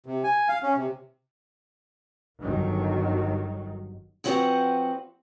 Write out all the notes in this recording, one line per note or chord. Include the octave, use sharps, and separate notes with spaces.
C3
G#5
F5
C#4
C3
G1 D#3 F#3
E2 F3 C4 F#4 B4 F#5